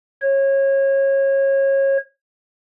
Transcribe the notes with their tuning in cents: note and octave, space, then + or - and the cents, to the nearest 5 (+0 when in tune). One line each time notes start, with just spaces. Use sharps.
C#5 -25